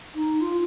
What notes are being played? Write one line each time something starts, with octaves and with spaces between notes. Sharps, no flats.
D#4
F4